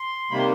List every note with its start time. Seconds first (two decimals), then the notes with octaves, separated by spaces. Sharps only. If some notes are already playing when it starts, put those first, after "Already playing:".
Already playing: C6
0.31 C3 D#3 G3 A#3 B5
0.38 C6